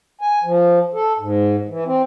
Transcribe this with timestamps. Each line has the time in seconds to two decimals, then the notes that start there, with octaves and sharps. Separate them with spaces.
0.21 G#5
0.44 F3
0.94 A4
1.19 G#2
1.69 E3
1.86 C4